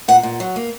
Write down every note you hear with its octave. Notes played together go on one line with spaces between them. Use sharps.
A#2 F#5
A#2
F#3
A#3